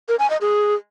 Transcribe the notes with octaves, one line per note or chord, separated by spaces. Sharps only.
A#4
G#5
D#5
G#4